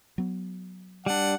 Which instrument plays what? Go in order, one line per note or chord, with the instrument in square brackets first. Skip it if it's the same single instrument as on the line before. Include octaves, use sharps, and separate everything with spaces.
[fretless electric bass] F#3 B3
[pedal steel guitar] G3 D4 [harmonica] F#5